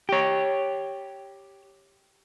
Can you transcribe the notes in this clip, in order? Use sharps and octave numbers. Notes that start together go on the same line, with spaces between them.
G4 C#5